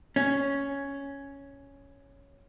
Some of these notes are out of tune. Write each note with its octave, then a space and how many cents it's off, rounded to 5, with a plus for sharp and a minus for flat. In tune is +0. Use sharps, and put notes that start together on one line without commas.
C#4 +5